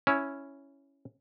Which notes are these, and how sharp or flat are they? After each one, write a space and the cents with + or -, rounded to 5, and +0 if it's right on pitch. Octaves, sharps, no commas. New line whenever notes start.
C#4 +0 E4 +0